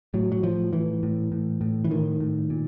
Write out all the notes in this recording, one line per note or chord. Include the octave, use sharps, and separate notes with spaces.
A2 F#3
F#3
A2 F3
A2 E3
A2
A2
A2
E3
A2 D#3
A2
A#2